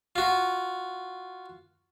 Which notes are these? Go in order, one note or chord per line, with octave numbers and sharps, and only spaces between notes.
F4 F#4